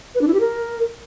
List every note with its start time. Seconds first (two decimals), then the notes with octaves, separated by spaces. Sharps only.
0.15 B4
0.21 D4
0.28 E4
0.34 G4
0.40 A#4